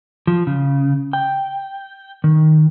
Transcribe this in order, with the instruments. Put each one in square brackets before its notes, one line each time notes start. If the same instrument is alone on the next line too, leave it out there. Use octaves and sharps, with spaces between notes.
[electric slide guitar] F3
C#3
G5
D#3